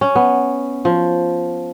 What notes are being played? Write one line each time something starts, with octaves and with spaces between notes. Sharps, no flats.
C#4
B3
F3